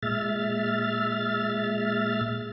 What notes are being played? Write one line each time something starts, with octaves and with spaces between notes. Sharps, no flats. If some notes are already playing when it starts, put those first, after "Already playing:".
A#2 G#3 E5 F6 A6